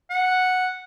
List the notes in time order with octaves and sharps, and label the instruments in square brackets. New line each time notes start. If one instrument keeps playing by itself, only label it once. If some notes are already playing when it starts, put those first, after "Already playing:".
[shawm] F#5